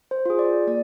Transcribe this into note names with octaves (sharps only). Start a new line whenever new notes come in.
C5
F4 G#4
D5
A#3 D5